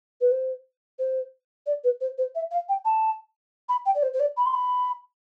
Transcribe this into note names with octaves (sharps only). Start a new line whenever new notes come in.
B4
C5
C5
D5
B4
C5
C5
E5
F5
G5
A5
B5
G5
D5
C5
C5
D5
B5
C6
B5